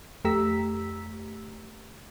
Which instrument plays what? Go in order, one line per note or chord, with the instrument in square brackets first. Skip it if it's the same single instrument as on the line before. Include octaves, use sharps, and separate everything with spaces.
[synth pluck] F2 A3 G4 A#5 E6 B6